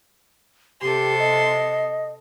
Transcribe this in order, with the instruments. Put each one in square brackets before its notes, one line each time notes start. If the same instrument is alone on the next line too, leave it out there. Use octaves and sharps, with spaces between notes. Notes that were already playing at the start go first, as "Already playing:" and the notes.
[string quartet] C3 A4 C6 [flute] G4
[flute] D#5